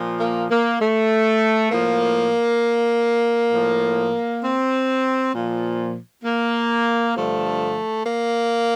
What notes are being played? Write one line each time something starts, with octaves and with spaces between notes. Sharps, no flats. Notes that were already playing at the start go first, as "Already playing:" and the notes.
Already playing: A#2 F3
A#3
A#3
A3
A2 F3 A#3
A2 F3
C4
A#2 F3
A#3
G2 D3 F3 A3
A#3